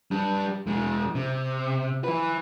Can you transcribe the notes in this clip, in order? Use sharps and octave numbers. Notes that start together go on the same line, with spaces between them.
G3 D4
E2 G#3
C3
E3 B4